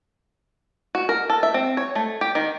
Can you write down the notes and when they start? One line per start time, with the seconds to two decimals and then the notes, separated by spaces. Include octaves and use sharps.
0.95 F#4
1.09 A#4
1.30 A4
1.43 E5
1.54 C4
1.77 C#5
1.95 A3
2.21 G4
2.35 D#3